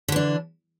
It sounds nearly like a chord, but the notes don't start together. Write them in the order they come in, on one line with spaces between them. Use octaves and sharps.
D3 E3 D4